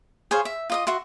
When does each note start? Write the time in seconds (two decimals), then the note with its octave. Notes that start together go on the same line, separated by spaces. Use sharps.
0.31 G#4 C5 C#5 F5
0.45 E5
0.70 F4 D#5 D#6
0.87 F#4 E5 C6